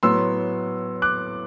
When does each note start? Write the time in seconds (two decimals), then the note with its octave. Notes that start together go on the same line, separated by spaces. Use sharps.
0.03 A2 F#3 B3 C6 E6
1.02 D6 F#6